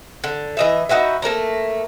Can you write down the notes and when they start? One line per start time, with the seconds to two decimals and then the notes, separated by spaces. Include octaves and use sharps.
0.24 D3
0.57 E3 D#5 E5
0.89 D#4 F#4 B4 E5
1.22 A3 A#3 D5 A#5